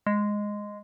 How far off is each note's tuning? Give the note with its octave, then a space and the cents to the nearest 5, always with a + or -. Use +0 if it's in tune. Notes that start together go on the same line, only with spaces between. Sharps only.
G#3 -5